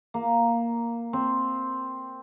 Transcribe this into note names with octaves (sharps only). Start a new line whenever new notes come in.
A#3
C4